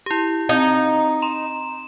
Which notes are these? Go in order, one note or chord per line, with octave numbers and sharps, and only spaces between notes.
E4 G4
C4 D#4
A#5 C6 E7